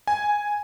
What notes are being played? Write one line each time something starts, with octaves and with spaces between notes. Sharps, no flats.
G#5